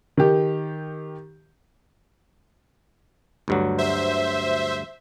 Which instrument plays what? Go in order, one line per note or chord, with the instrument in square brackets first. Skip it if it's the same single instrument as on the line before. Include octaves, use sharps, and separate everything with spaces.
[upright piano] D#3 G4
[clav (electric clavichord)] D2 G2 F#3
[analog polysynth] C5 E5